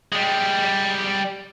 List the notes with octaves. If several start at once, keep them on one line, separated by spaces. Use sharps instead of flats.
G3 G#3